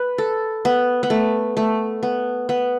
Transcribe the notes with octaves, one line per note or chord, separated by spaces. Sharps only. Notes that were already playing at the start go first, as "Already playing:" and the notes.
Already playing: B4
A4
B3
B3
A3
A3
B3
B3